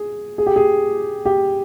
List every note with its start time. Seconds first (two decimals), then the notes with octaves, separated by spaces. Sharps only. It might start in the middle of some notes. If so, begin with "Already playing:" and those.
Already playing: G#4
0.38 G#4
0.46 G4
0.56 G#4
1.25 G4